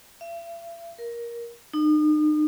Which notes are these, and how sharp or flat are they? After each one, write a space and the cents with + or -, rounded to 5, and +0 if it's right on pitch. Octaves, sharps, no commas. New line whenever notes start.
E5 +45
A#4 +15
D#4 -40